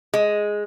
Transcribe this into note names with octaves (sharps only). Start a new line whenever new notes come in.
G#3